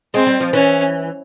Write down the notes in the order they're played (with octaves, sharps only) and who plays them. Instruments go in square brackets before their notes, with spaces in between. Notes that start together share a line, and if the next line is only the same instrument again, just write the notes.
[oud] G#3 [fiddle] C4
[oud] G3
F3
[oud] E3 [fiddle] C#4